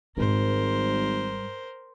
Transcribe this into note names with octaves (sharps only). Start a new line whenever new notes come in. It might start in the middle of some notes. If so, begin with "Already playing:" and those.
G#1 G#2 G3 A#4 C5